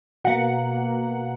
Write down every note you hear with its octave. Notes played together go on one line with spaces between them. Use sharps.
B2 A#3 F#5